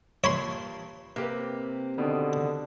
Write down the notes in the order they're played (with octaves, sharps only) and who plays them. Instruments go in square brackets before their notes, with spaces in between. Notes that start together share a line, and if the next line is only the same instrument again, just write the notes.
[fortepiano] G2 A#2 [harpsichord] C#5 B5 C6
[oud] C3 [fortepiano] A#3 G4 B4
[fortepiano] B2 D#3 [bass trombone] D3